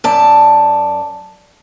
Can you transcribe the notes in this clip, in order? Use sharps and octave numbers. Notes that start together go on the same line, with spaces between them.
F#2 D5 A5